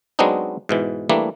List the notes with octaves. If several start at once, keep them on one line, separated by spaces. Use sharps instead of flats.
F#3 G#3 B3 C4 D4 D#4
G#2 B2 E3
E3 G3 A3 A#3 D4